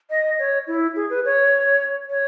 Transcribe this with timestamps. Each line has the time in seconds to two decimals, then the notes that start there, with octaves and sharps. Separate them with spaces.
0.10 D#5
0.39 C#5
0.67 E4
0.96 G#4
1.10 B4
1.25 C#5
2.10 C#5